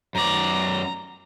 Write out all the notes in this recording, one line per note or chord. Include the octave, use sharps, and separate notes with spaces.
F#2 D5 A#5